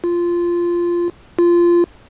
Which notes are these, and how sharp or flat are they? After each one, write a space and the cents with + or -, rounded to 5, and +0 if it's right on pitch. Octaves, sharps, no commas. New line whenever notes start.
F4 -10
F4 -15